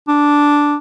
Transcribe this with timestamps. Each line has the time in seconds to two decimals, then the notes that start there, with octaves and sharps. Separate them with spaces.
0.08 D4